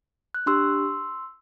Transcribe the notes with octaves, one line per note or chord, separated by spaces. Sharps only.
F#6
D4 G4 C6 E6